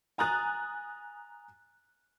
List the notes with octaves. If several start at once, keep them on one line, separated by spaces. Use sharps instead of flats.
G#5 A#5 D#6 F#6 A6